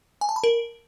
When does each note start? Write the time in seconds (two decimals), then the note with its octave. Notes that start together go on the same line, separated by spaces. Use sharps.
0.21 G#5
0.29 A5
0.36 B5
0.44 A#4